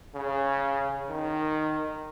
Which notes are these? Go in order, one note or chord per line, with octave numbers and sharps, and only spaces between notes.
C#3
D#3